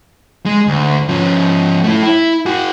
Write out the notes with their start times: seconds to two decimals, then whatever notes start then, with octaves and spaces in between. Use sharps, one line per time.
0.46 G#3
0.67 D2
1.09 F3 C#4
1.84 A3 E4
2.03 E4
2.46 F#4 G#4